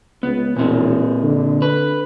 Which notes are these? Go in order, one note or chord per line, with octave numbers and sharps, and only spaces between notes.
C#2 B3
E1 A#2 C4
D3
B4